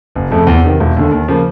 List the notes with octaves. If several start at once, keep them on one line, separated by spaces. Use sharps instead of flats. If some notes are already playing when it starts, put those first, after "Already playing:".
F#1
F2 C#3 F3 A3
E2
C3 D#3
E1
D#2 D3
D#2
C#3 F3 A#3